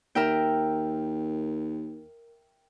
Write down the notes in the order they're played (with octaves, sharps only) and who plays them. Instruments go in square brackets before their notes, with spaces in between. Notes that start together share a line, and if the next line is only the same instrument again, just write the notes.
[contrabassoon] D#2 [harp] A#4 E5 G5